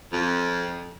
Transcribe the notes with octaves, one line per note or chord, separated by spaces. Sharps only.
F2